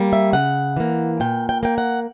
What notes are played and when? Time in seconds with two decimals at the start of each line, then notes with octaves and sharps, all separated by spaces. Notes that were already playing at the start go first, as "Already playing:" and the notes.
Already playing: G3 A#3
0.13 E5
0.33 C#3 F#5
0.77 E3 A#3
1.20 A#2 G5
1.49 G5
1.63 A#3 G5
1.78 F#5